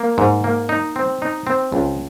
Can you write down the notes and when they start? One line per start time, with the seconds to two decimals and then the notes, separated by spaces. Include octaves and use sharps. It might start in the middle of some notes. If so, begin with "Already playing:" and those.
Already playing: A#3
0.18 G#2
0.44 A#3
0.69 D#4
0.96 C4
1.22 D#4
1.47 C4
1.72 C#2